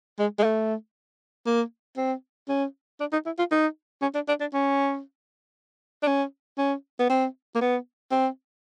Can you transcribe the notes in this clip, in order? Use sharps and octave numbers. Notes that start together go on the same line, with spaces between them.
G#3
G#3
A3
A#3
C4
C#4
D4
D#4
E4
F4
D#4
C#4
D4
D4
D4
C#4
D4
C#4
C#4
B3
C4
A#3
B3
C4